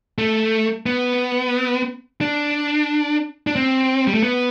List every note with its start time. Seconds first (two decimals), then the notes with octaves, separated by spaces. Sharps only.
0.18 A3
0.86 B3
2.21 D4
3.47 D4
3.56 C4
4.07 G3
4.14 A3
4.22 B3